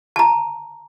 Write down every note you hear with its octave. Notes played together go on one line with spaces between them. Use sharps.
A5 A#5